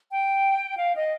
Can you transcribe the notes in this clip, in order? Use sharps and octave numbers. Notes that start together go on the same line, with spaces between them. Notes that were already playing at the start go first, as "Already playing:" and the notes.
G5
F5
D#5